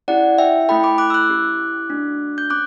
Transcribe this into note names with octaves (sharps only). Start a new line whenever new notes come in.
C#4 E4 G4 D5 F#5
E5 G5
A3 E4 A4 G5 B5
B5 D6
D6 F#6
E6
D6 F#6
C#4 E4 G4
A3 D4 F#4
G6
C#4 D6 F#6